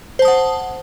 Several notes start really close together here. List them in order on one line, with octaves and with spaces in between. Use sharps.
C5 A5 D#6 F#5